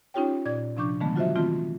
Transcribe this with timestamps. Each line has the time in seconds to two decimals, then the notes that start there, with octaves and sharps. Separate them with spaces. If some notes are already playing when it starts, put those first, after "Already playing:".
0.14 C#4 D#4 F4 G4 C#5 G5
0.45 A#2 D5 G#6
0.77 C3 F3 D4 C#6 D6 G6
1.00 D3 D#3 F3 G#3 A3 B3
1.16 F#3 F4 F#4 C5 D#5 E5
1.36 D#3 E3 A3 C4 F4